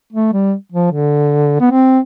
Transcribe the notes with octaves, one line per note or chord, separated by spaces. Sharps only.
A3
G3
F3
D3
B3
C4